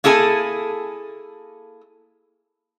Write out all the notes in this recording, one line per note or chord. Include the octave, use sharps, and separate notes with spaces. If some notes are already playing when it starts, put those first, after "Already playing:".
A#3 E4 G#4 A4 G#5